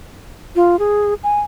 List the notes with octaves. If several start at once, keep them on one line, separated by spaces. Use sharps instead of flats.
F4
G#4
G#5